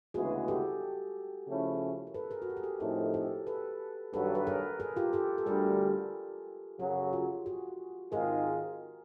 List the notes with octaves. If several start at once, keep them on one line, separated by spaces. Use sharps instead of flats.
D2 C#3 E3 G#3 B3 F#4 G#4
G4 A4
C#3 F3 A3 C#4 E4
A#4
A4 B4
G#4 A#4
F#4
G4
G#4
G4 A4
A2 F3 A3 C4 D#4 G#4 A#4
G4 A4
A4 B4
G2 D#3 F#3 A4 B4
B4
G#4 A#4
G#4 A#4
F4 G4
G4 A4
A4
D2 D3 G3 G#4 A#4
F#2 C#3 F#3 F#4 G#4
F4 G4
F#4 G#4
G#2 D#3 G#3 C4 F4 G#4 A#4